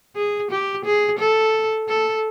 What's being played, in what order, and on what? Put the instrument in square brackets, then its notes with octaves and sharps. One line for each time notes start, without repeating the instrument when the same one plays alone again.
[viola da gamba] G#4
G4
G#4
A4
A4